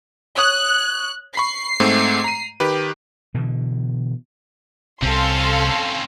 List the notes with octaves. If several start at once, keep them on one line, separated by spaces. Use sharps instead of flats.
C#5 D#6 F#6
B5 C#6 C7
G#2 A3 C4
A#5 D#7
D#3 G4 B4
B2 D3 E3
C2 C3 C4 C#4 A4 F5 C6